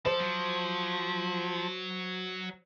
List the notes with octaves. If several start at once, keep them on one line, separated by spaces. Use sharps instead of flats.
F3 A4 C5
F#3